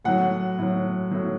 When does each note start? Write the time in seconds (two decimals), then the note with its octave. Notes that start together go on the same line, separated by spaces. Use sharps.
0.04 A2 F#3 F#5
0.58 A2 F#3
1.11 A2 F#3